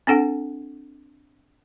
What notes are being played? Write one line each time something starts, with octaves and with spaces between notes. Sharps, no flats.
C4 D4 A4 F#5